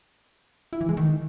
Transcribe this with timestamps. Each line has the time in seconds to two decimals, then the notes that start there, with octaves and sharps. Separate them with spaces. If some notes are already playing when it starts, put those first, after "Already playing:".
0.73 E4
0.81 E3
0.89 G#3
0.97 D#3